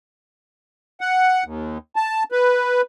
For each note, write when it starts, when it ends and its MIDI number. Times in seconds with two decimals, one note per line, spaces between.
1.01 1.44 78
1.44 1.78 39
1.96 2.23 81
2.32 2.82 71